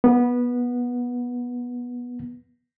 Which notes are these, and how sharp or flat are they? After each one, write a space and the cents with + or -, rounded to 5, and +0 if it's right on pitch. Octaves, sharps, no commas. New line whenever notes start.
B3 -15